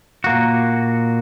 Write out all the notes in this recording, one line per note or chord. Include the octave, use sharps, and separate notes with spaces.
A#2 A#3 F#4